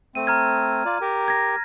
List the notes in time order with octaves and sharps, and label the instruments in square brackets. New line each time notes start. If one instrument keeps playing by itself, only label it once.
[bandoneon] A3 C4 [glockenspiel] D#7
[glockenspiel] A#5 F6 G#6
[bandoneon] F4 D5
G4 A#4
[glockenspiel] G#6 A#6